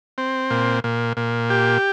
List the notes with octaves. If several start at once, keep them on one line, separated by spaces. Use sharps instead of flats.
C4
A#2
A#2
A#2
G4